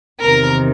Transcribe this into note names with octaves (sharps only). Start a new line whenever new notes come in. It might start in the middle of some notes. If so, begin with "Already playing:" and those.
E2 C3 D#3 A#4